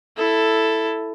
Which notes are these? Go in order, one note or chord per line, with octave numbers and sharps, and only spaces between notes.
E4 A4